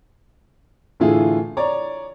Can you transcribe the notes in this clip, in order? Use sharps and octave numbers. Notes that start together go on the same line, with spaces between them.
A2 D3 E3 A3 F4 G#4
C#5 D5 A#5